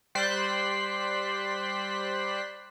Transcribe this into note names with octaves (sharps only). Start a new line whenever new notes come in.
G3 C5 D5 C6 F#6 B6